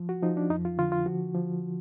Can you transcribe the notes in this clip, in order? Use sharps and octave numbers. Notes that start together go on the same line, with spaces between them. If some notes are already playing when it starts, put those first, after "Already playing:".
Already playing: F3
F#4
F3 D#4
D4
F2 D#4
F4
D3 F4
F4
F3 F#4
F3